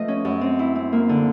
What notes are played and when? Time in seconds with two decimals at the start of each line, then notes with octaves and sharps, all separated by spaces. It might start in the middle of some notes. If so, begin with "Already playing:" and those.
Already playing: F3 A3 B4 D#5
0.08 C#4
0.25 F#2
0.41 C4
0.59 E4
0.75 C4
0.93 A#3
1.09 D3